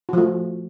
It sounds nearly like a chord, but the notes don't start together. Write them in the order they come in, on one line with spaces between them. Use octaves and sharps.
F#4 F3 A3